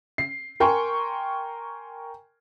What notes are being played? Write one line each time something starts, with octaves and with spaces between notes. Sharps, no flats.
C7
A#4 G5 G#5 C6 C#6